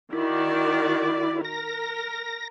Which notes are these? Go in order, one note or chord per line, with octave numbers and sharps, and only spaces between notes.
D#3 E4 F#4 D5
A#4 A#6